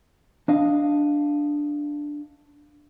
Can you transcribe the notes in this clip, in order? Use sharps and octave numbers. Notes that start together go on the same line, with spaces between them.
D4 D#5 F5